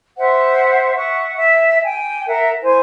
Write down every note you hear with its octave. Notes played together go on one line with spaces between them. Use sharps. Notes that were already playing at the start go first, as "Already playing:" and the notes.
C5 E5 F#5
E5 F#5 C#6
E5
G5 G#5
A#4 E5 F#5
E4 C5 G#5